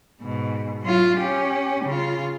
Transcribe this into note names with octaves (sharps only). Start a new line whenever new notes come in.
G#2 B2
F#3 F4
C#4 G4
C#3 F4